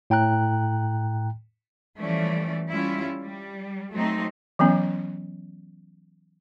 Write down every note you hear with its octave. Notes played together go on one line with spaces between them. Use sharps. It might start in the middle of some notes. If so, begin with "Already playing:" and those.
A2 G5 A#5 F#6
E3 F3 G3 A3 C#4 D5
G3 C#4 E4 F4
G3
F#3 A3 C4 D#4
E3 F#3 B3 C#4